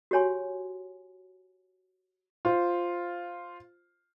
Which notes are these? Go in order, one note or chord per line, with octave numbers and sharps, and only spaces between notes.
F#4 G4 C#5 G#5 C6
F4 C5